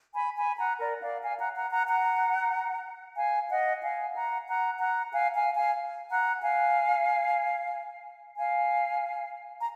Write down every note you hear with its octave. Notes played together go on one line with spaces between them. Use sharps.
G#5 B5
G#5 B5
F#5 A#5
A#4 D5
D5 F5
F5 G#5
F#5 A#5
F#5 A#5
F#5 A#5
F#5 A#5
F5 G#5
D#5 F#5
F5 G#5
F#5 A#5
F#5 A#5
F#5 A#5
F5 G#5
F5 G#5
F5 G#5
F#5 A#5
F5 G#5
F5 G#5
A#5